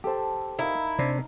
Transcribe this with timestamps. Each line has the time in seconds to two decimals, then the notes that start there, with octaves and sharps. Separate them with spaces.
0.04 G4 A4 C5 A5
0.59 D#4 E4 A#4 F5
0.99 C3 D4 C5 D5